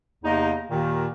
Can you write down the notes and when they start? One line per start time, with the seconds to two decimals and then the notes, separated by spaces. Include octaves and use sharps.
0.24 E2 C3 A#3 D#4 D#5
0.70 D#2 A#2 D#3